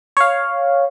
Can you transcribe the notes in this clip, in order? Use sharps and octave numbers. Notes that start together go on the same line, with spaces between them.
C#5 F5